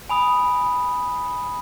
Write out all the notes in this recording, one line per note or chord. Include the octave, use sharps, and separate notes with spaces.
G#5 B5 D#6